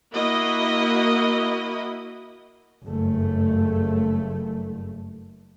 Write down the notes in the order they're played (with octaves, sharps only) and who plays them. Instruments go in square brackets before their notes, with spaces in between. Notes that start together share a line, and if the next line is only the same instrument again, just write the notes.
[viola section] A#3 E4 F#4 D#5
[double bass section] F#1 G2 A3